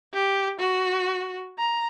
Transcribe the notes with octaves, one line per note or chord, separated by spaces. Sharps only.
G4
F#4
A#5